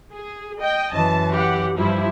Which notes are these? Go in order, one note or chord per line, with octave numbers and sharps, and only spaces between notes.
G#4
D#5 G5
F#2 E3 A5
G4 F#5
G2 F3 G3 E4